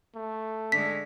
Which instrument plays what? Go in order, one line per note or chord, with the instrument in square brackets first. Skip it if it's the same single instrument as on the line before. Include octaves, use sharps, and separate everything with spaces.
[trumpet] A3
[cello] D3 G#3 [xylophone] B6